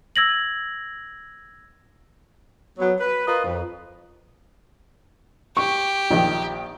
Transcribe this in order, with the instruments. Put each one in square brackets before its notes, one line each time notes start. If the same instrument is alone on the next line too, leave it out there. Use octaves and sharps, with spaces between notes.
[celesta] E6 G#6 A#6 F#7
[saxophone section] F#3 B3
B4
F4 A#4 B4 D#5
F2
[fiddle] G4 [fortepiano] C#6
[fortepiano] A#1 D#3